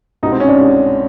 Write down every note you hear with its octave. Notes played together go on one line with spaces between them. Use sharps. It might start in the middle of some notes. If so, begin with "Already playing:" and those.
C2 B2 G#3 B3 D#4
C4
C#4
D4
C2 B2 G#3 B3